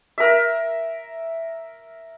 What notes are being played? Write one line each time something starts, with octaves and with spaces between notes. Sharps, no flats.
A#4 E5